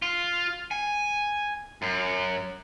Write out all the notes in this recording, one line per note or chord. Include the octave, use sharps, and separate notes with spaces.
F4
G#5
F#2